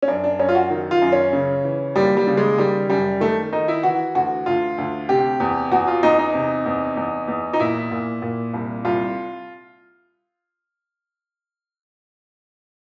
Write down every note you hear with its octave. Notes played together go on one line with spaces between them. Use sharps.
C#4
F#2 D4
D4
F#2 C#4
F4
F#4
D#3
F4
F#2
C#4
C#3
E3
D#2 G3
G3
C#3
G#3
D#3 G3
F#2 G3
D#3 A3
D#3 D#4
E4
E3 F#4
D2 F#4
D2 F4
D2
C3 G4
E2
E2 F#4
F4
E2 D#4
D#4
C3
E2
E2
E2
D#4
A#2 E4
A#2
A#2
C2
C2 F4